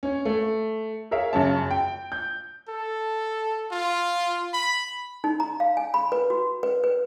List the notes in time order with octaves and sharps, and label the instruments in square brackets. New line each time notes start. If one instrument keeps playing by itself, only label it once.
[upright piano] C#4 C#5
A3
G#4 A#4 C#5 E5 F5
F#2 C#3 C#5 A5
G5
G6
[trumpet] A4
F4
B5
[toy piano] D#4
A#5
F5
G#5
B5
B4
F#4
B4
B4